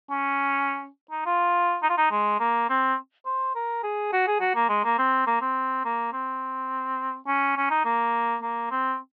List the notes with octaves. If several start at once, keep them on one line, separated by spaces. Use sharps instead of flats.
C#4
D#4
F4
D#4
F4
D#4
G#3
A#3
C4
C5
A#4
G#4
F#4
G#4
F#4
A#3
G#3
A#3
C4
A#3
C4
A#3
C4
C#4
C#4
D#4
A#3
A#3
C4